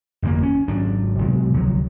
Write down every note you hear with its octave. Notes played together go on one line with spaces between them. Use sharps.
G1 F2 E3 A#3
C#4
G#1 F#3 D4
B2 F#3 G#3 C4
D1 C2 F3 F#3